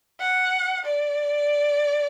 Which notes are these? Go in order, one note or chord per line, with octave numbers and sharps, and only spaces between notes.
F#5
D5